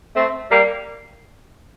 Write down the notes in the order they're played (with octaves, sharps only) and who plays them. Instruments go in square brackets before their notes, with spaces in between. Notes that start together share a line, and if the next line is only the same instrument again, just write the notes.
[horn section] A3 C4
G3 A#3